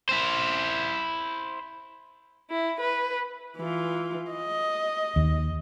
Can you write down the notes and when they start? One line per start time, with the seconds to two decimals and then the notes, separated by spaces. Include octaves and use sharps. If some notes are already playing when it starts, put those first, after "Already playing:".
0.09 E4 C5
2.50 E4
2.79 B4
3.57 E3 F4
4.31 D#5
5.16 D#2